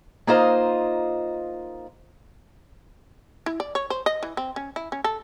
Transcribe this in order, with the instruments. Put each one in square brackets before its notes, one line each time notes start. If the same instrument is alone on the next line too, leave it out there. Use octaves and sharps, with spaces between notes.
[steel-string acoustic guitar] A#3 D#4 F4 C5 D#5 A#5
[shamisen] E4
D5
C#5
C5
D#5
E3
C4
C#4
E4
C#4
A4